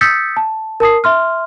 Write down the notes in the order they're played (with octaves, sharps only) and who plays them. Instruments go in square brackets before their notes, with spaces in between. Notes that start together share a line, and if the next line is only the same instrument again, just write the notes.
[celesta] D#6 E6 G6 A6 B6 C#7
A5
A#4 A5 D#6 C7
E5 C6 F6